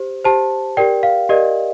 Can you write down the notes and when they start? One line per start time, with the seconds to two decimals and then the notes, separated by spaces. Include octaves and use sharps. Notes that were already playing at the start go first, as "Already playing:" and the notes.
Already playing: G4 C5
0.25 G4 C5 A5
0.77 G4 A#4 D5 G5
1.03 F5
1.29 G4 A#4 D5 D#5